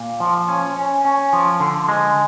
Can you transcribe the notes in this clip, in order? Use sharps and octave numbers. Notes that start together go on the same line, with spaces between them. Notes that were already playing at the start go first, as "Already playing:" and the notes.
Already playing: A#2
F3
C#4
C#4
C#4
F3
D3
G#3